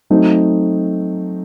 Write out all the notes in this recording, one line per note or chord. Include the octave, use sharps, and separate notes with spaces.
F#3 A3 C4 D#4